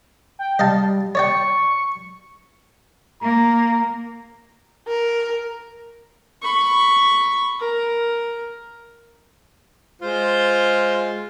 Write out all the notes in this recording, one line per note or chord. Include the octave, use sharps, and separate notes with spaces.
G5
G3 D#5 F5 A5
C#5 D5 G5 C#6
A#3 A#5
A#4
B5 C#6
A#4
G#3 F4 C5